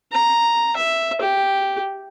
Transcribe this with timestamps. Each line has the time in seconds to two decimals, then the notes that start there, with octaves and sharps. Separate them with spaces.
0.12 A#5
0.76 E5
1.21 G4